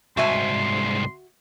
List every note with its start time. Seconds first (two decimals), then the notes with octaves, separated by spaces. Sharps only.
0.17 C2 G#2 F#4 E5 G#5 C6